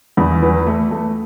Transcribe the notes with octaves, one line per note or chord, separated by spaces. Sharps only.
E2 B5
E3
A3
A3